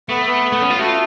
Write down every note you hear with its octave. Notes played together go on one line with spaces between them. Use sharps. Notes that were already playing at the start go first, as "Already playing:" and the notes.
A3 B3
B3
A3
C#4
F4
A3 F#4
F4